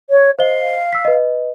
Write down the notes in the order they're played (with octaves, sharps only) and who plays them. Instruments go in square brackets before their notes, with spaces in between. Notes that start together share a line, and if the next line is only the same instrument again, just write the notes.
[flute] C#5
[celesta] C5 D#5 G7 [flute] F5
[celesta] E6 B6
B4 D#5